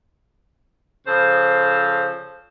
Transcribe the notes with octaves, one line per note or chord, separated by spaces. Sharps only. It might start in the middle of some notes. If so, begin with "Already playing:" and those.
C#3 F3 A4 C5